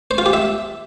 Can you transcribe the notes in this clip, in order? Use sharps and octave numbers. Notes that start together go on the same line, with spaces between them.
C5
F4
G4
E5